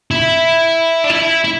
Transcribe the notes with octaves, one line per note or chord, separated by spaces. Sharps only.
E4
D4
E4
E4